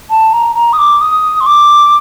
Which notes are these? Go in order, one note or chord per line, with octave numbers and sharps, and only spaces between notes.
A5
A#5
A#5
D#6
D6
D#6
C6
D6